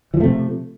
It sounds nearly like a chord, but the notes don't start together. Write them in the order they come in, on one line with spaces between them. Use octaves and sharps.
E3 F3 A3 C3